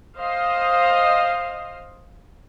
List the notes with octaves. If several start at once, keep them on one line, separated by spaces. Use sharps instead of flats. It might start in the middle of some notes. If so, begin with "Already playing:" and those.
C5 D#5 F5